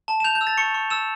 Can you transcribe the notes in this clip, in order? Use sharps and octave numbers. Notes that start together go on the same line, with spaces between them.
A5
E7
G6 F7
G6
E6
A6
C#6 C#7
C#6
E6 E7